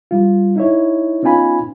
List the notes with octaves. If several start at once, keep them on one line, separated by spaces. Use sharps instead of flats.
G3 F4
D#4 E4 C#5
B3 C#4 D#4 F4 G#5 B5